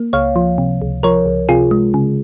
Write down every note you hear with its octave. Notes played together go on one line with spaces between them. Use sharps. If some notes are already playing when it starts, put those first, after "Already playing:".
Already playing: A#3
C#2 C#5 F5
F3
C3
C#2
F3 A#4 C#5
C#2
C3 F4 G#4
G#3
C#3